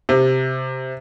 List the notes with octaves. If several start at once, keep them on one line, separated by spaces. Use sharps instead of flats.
C3